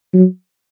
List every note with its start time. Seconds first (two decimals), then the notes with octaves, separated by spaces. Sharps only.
0.14 F#3